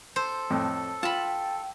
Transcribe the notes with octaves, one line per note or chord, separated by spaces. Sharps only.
A4 C5
F2 A2
F4 G5 A5 B5